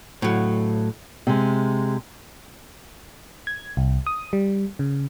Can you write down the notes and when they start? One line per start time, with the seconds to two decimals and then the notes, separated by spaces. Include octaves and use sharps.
0.22 A2 F#3
1.27 C3 G#3
3.47 G#6
3.77 C2
4.07 D#6
4.33 G3
4.79 C#3